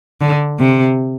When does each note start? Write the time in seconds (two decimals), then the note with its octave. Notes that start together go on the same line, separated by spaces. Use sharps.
0.21 D3
0.60 C3